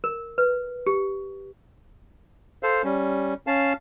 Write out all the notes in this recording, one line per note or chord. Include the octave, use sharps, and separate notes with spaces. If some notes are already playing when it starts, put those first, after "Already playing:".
A#4
B4
G4
A4 C5 F5
G3 C#4
C#4 F5 A5